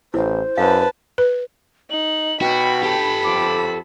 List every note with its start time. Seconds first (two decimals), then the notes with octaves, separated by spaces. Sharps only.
0.14 A1 E4 C5
0.58 F#2 B4 F5 A5
1.18 B4
1.90 D#4 F#7
2.41 B2 F#4 G5 B5
2.83 G4 A4
3.24 F2 D6